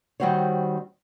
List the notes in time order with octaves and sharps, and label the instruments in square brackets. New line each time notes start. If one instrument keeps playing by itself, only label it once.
[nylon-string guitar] D#3 G3 C4 F#4 C5 C#5